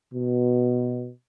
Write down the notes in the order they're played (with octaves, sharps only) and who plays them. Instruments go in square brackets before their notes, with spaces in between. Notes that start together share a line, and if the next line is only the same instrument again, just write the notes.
[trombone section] B2